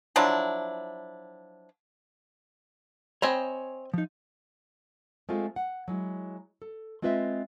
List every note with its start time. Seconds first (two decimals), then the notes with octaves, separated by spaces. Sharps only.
0.16 F3 F#3 D4 E4
3.22 C4 C#5 D#5 G#5 B5
3.94 F3 D#4
5.29 G#3 A3 C4 F4
5.56 F#5
5.88 F#3 G#3 E4
6.62 A4
7.02 G#3 C4 F4 B4 D#5 E5